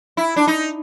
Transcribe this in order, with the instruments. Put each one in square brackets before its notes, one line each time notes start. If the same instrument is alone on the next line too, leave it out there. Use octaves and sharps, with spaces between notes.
[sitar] E4
D4
D#4